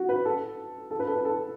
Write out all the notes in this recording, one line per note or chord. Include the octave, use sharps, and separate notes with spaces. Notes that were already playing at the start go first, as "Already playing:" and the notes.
Already playing: F#4
B4
A4
A4
B4
A4
B4
A4